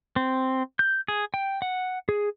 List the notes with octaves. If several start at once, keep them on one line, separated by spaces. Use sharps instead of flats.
C4
G6
G#4
G5
F#5
G#4